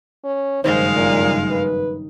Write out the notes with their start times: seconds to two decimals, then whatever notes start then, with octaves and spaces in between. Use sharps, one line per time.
0.24 C#4
0.64 F#1 G2 D#3 G#3 D#4 C5 C#5 F5
0.95 A#2
1.51 B4